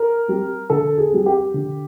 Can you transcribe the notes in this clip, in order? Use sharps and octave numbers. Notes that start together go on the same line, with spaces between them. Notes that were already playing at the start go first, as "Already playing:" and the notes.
Already playing: A#4
G3 C4
D3 A4
G#4
G3 C4
G4
D3